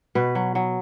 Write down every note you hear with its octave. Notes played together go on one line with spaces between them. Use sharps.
B2 B4
F#3
F#3